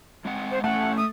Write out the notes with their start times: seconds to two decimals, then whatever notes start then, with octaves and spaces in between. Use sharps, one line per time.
0.25 G#3 C4 F#5
0.51 C5
0.64 A2 A3 C#4 F#5
0.97 D#6